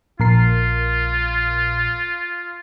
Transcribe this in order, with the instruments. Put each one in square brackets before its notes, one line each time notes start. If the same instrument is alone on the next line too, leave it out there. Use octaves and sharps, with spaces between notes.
[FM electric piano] A#1 A#4 C7 [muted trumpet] F4